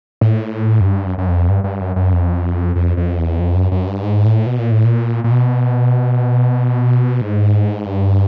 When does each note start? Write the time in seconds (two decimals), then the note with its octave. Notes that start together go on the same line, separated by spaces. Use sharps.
0.21 A2
0.80 F#2
0.85 G2
1.06 F#2
1.18 F#2
1.28 F2
1.49 G2
1.64 G2
1.81 F#2
1.96 F#2
2.13 F2
2.76 F2
2.97 F2
3.18 E2
3.39 F2
3.55 F#2
3.72 F#2
3.87 G2
4.03 G#2
4.25 A2
4.46 B2
4.59 A#2
4.71 A2
4.85 A#2
5.24 A#2
5.31 B2
7.21 G#2
7.86 G2